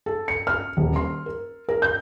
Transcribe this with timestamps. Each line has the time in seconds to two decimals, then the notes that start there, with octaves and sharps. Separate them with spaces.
0.06 A4
0.28 C#7
0.47 F6
0.77 D#1
0.96 C6
1.26 A#4
1.69 A#4
1.82 G6